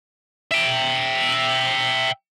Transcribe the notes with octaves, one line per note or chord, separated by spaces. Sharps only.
E5 G5